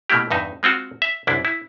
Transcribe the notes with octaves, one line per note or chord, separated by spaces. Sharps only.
B2 A3 A#3 E4 G4
E2 G2 D#4 E5
G#3 C4 F4 F#4
E5
C2 F#2 D4 E4
E4